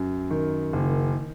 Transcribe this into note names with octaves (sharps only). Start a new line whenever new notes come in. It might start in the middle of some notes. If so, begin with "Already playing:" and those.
Already playing: F#2
D#3
F#1